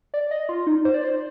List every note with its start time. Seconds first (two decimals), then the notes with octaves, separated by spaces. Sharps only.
0.14 D5
0.31 D#5
0.49 F4
0.67 D#4
0.85 C5
0.94 D5
1.04 C5